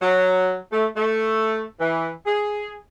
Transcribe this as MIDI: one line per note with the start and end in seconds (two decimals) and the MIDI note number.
0.02 0.58 54
0.72 0.87 57
0.97 1.63 57
1.80 2.09 52
2.26 2.75 68